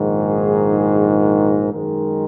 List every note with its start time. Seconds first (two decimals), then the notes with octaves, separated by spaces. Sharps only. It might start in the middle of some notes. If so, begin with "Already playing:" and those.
Already playing: A#1 G#2 D#3
0.15 G#4
1.20 A#4
1.72 F#2 D#3 G#3 A#4